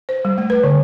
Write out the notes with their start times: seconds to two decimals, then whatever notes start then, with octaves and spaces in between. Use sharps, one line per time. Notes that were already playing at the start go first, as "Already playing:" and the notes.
0.09 C5
0.25 G3
0.38 A3
0.50 B4
0.63 D3